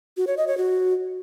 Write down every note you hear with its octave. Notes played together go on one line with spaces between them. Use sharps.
F#4
C#5
D#5
C#5
F#4